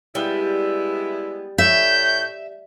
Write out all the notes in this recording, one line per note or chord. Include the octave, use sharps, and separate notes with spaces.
G3 G#3 B3 E4
A2 C#5 E5 G6